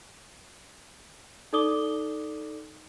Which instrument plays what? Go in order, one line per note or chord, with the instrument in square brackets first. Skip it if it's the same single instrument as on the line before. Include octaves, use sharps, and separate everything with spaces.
[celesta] D#4 A4 D5 D6 D#6 G7